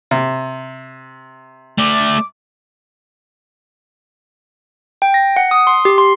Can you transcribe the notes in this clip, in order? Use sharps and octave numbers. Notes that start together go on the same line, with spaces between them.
C3
A3 D5 D6
G5
A#6
F#5
D#6
C6
G4
C6